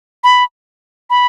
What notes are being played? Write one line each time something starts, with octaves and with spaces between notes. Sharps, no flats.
B5
B5